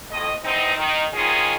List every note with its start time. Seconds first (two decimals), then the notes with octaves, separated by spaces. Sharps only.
0.11 F2 A2 D#5
0.44 E2 C4 D#4
0.77 D#3
1.14 D#2 G#2 D#3 C#4 F4 G#4